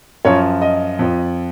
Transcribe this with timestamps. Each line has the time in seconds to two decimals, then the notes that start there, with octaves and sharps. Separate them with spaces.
0.25 F#2 F3 C#5
0.62 D#5
0.99 F2 F3